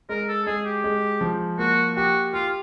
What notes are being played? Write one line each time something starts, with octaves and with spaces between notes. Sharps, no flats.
G#3 A#4
A4
G#3 G#4
G4
G#3
F3
A#3 F#4
F#4 G4
F4 G4